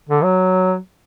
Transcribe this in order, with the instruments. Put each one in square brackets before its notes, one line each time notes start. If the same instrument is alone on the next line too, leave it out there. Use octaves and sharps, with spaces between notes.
[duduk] D3
F#3